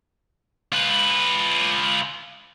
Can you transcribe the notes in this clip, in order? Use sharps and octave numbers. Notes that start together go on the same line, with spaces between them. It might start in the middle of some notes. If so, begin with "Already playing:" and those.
F4 B4